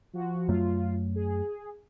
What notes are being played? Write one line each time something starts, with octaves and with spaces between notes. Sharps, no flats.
F3 F#4
F#2 F#3 A3 F4
G#4